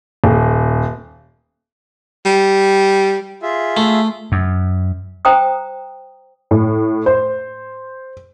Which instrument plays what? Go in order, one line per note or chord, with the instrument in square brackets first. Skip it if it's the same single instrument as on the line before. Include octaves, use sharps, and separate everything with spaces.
[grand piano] D#1
[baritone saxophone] G3
[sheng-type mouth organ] F4 G#4 E5
[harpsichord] A3
[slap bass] F#2
[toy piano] C5 G5 A#5 D#6
[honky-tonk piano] A2
C5